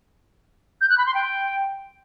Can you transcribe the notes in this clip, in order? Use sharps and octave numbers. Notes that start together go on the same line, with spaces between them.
G6
F#6
B5
C6
G5